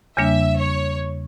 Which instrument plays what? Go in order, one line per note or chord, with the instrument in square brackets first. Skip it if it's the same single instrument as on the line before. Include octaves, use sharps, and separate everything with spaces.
[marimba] E2 C#3 G3 A#3 D4 [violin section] E5
[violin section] C#5